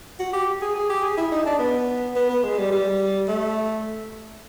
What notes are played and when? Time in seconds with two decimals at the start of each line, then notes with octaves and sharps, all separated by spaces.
0.19 F#4
0.33 G4
0.62 G#4
0.75 G#4
0.89 G4
1.03 G#4
1.17 E4
1.32 D#4
1.46 D4
1.59 B3
2.16 B3
2.29 B3
2.44 G#3
2.58 G3
2.72 G3
3.28 A3